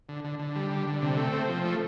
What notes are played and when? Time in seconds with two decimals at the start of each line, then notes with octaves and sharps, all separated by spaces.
0.09 D3
0.24 D3
0.39 D3
0.56 G3
0.71 D3
0.87 D3
1.02 C3
1.17 A3
1.33 C4
1.49 F3
1.65 A3